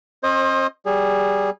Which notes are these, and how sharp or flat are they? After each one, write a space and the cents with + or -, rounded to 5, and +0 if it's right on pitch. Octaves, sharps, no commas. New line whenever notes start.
C4 +45 C5 +30 D#5 +0
G3 -15 G#4 -20